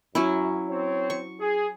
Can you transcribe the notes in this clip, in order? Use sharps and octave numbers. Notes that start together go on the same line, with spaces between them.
F#2 F#3 C#4 E4
C4 C#5
C#6
G#4